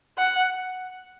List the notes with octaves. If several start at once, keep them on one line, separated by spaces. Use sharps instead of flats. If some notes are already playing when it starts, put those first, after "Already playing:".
F#5